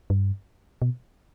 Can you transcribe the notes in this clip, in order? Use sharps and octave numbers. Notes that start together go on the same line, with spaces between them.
G2
B2